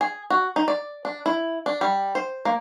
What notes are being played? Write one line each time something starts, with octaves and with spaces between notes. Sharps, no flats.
G#4
F#4
D#4
D5
D4
E4
D4
G3
C5
A#3